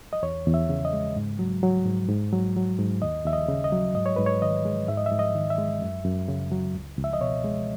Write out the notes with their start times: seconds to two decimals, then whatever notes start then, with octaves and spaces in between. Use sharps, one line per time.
0.13 D#5
0.23 E2 C#5
0.46 E2
0.54 E5
0.69 C#3
0.85 D#5
0.93 G#3
1.16 G#2
1.39 F#3
1.63 F#3
1.86 G#2
2.09 G#2
2.33 F#3
2.56 F#3
2.79 G#2
3.02 D#2 D#5
3.25 D#2 E5
3.33 D#5
3.48 C#3
3.64 D#5
3.72 F#3
3.95 G#2 D#5
4.06 C#5
4.16 G#2 B4
4.26 C#5
4.42 D#3 D#5
4.65 G#3
4.88 G#2 E5
4.97 D#5
5.06 E5
5.12 G#2
5.19 D#5
5.35 D#3
5.50 E5
5.58 G#3
5.82 F#2
6.05 F#2
6.28 C#3
6.52 F#3
6.75 C#2
6.98 C#2
7.04 E5
7.13 D#5
7.21 B2 C#5
7.44 G#3